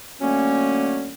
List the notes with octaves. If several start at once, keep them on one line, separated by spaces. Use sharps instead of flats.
D3 F#3 A3 A#3 C#4